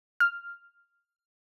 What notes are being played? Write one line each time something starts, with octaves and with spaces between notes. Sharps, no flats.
F6